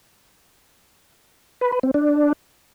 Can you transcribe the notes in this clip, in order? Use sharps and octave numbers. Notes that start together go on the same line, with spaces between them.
B4
B4
C4
D4